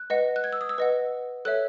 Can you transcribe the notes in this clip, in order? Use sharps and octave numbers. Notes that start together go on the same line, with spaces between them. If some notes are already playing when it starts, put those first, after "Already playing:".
Already playing: F#6
B4 D#5 F#5
F#6
G#6
E6
D#6
E6
B4 D#5 F#5
A4 C#5 E5 F#6